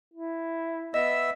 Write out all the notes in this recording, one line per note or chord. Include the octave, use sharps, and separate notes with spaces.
E4
B3 D#5 E5 E6